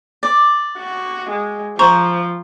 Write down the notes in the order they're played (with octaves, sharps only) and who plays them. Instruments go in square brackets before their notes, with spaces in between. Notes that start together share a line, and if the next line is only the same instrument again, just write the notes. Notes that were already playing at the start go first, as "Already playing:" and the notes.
[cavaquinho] D5
[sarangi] F#4
G#3
[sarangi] F3 [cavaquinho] C5 [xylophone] A#5 C#6